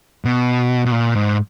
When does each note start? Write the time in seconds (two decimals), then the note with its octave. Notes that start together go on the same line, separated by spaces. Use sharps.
0.25 B2
0.85 B2
0.91 A#2
1.15 G#2